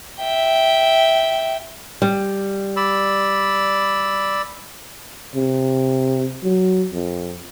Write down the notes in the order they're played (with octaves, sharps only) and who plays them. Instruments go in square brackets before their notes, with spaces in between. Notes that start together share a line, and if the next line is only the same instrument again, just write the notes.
[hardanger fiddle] E5 G5
[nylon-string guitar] G3
[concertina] D5 B5 E6
[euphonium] C3
F#3
F2